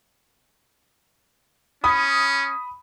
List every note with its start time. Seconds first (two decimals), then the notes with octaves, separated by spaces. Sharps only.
1.84 C#4 B5 D#6